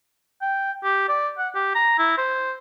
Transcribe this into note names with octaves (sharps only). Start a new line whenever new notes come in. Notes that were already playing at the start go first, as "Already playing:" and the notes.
G5
G4
D5
F#5
G4
A#5
E4
C5